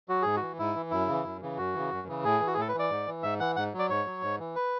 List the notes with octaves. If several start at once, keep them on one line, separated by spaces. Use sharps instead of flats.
F#3 F#4
G#2 G#4
F#4
E3
G#2 E4
E3
F#2 E4
C#3 E3
F#2
C#3 E3
F#2 F#4
C#3 E3
F#2
C#3 E3
A2 G#4
E3
F#4
G#4
A2 A4
B4
E3
D5
G#2
E3
G#2 E5
E3 F#5
G#2 F#5
F#3
D5
G#2 C#5
F#3
G#2
E3
B4